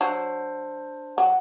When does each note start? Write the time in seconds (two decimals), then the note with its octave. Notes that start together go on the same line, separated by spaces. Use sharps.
0.01 F#3 D4 C5
1.18 F#3 F#5